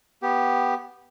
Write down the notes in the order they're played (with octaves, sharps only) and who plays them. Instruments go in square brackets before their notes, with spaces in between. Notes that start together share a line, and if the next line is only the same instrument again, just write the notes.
[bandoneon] B3 G4